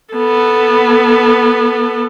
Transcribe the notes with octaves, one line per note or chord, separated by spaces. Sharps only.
B3 A4